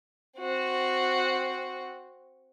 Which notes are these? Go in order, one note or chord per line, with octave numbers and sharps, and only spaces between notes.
C4 F#4